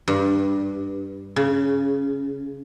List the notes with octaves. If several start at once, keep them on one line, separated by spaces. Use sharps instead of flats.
G2
C#3